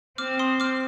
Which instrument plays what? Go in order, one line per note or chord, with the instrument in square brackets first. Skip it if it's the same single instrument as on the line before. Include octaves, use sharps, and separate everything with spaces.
[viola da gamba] C4 [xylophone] D6 F6
[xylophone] C6 D#6
D6 F6